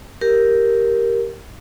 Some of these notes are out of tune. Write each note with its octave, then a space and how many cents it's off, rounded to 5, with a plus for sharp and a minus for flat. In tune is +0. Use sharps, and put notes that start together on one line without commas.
G4 +0 A#4 +0